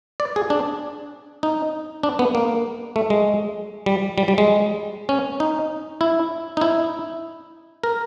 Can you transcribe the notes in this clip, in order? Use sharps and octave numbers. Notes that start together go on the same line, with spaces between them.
D5
G#4
D4
D#4
D4
B3
A#3
A3
G#3
G3
G3
G3
G#3
C#4
D#4
E4
D#4
E4
A#4